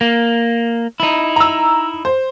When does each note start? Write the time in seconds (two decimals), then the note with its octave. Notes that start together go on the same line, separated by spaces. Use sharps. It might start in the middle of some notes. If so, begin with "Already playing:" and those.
0.01 A#3
1.00 D#4 E4
1.36 A#5 E6
2.05 C5